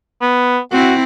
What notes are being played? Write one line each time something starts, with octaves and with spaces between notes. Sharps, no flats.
B3
C4 E4 F#4